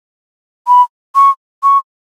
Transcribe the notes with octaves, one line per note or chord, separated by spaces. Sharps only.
B5
C#6
C#6